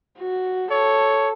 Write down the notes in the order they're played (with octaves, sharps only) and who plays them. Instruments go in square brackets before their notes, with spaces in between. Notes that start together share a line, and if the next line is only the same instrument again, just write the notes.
[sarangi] F#4
[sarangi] A4 [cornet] C#5